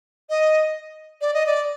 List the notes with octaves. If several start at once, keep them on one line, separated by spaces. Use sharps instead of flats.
D#5
D5
D#5
D5